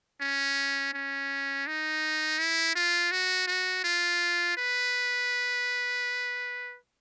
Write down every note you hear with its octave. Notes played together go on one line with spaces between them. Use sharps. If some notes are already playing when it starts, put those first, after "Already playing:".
C#4
C#4
D#4
E4
F4
F#4
F#4
F4
B4